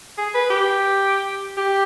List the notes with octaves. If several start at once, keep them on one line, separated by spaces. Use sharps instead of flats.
G#4
B4
G4
G4